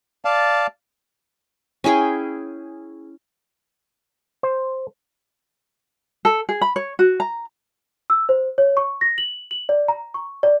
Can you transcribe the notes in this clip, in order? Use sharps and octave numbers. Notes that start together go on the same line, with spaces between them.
D5 F5 A5
C#4 E4 G#4 G5
C5
A4
G#4
B5
C#5
F#4
A#5
E6
C5
C#5
C#6
A#6
F#7
F#7
D5
A#5
C#6
D5